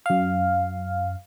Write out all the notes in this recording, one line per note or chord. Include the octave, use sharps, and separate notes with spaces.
F#2 F5